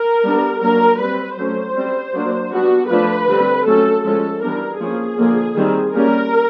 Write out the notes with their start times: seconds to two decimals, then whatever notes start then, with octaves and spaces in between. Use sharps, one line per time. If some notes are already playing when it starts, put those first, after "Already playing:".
Already playing: A#4
0.24 G3 B3 D4
0.61 F#3 A#3 D4 A#4
0.99 G3 C4 B4
1.37 F#3 A3 C#4 C5
1.75 G3 C4
2.13 F#3 A#3 D4
2.51 G3 B3 D4 F#4
2.90 F3 A3 D4 B4
3.27 D3 G3 C4
3.66 F#3 A3 C#4 A4
4.04 F3 G#3 C#4 A4
4.42 E3 G3 B3 D4 A#4
4.80 F3 A#3 C#4 G#4
5.18 D3 F3 A#3
5.56 D#3 G3 C4
5.94 G3 A#3 C#4 A#4